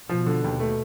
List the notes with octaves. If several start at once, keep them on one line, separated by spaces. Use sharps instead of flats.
B2 F3
D3
D#2
A3